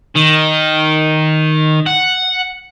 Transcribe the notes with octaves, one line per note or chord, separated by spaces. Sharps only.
D#3
F#5